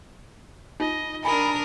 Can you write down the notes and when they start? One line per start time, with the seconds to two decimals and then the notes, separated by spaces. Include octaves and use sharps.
0.80 D#4 F4 D#5
1.25 D4 A#4 G#5 B5 D#6